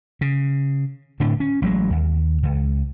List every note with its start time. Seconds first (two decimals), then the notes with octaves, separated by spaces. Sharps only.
0.21 C#3
1.20 D1 A2 D3 D4
1.40 C#4
1.62 A1 F#3 G#3
1.90 D#2
2.43 C#2